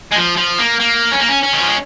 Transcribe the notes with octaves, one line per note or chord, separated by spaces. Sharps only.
G#3
F3
F3
A#3
A#3
C#4
A#3
C#4
C#4
D#3
F3
G#3